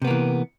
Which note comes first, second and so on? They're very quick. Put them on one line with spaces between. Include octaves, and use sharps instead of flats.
C3 B3 A#3 E3